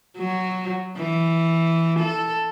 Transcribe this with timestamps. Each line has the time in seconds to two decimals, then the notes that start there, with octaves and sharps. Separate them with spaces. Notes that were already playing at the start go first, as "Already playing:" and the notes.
0.18 F#3
0.97 E3
2.00 A4